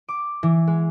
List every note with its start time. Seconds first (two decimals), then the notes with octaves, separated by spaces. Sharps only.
0.09 D6
0.43 E3
0.67 G#3